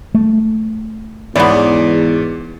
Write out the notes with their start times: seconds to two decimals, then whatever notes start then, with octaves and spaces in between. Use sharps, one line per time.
0.14 A3
1.36 E2 G#2 E3 B3 C#5 D5